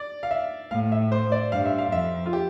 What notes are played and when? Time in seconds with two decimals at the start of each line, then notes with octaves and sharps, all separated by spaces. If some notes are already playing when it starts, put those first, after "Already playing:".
Already playing: D5
0.23 F5
0.31 E5
0.71 A2 F5
0.92 E5
1.12 C5
1.32 D5
1.52 G2 F5
1.65 E5
1.78 F5
1.92 F2 E5
2.26 F4
2.33 G4